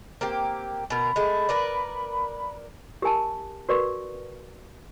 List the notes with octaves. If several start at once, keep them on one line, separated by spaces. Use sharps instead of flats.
A#3 C4 G4
B2 A#4 B5
G#3 A3
A#4 B4 D5
G4 A#4 G#5 A5
F#4 A#4 B4 D5 C#6